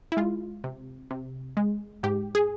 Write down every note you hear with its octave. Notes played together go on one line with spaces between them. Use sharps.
E4
G#3 F4
C3
C3
G#3
G#2 G4
G#4